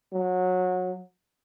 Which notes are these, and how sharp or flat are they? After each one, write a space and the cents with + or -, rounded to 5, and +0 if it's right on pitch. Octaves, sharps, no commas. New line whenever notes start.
F#3 -20